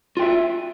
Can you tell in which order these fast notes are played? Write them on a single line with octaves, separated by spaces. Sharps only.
F4 G5 E5